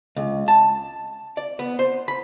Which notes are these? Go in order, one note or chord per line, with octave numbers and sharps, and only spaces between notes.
C#2
A5
D5
B3
C5
B5